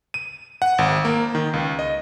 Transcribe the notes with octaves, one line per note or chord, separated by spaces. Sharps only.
D#7
F#5
G#1
A#3
D#3
C#2
D#5